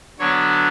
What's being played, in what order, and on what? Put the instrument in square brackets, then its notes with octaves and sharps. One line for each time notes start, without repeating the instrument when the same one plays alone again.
[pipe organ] D3 F#3 B3 D4 C#5